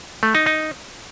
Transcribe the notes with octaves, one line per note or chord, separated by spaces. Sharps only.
A3
D#4
D#4